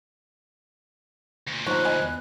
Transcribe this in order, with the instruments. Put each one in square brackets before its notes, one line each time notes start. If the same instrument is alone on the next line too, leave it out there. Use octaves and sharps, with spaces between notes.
[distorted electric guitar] D2 A#2
[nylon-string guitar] F3 A#3 D#4 [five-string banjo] C#5 A#5 [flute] F#6
[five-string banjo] D#5 G#5 B5
[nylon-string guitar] E2